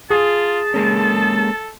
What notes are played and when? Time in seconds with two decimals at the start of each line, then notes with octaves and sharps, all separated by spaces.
0.10 F4 G#4 A5
0.74 G#3 A#3 C#4 A4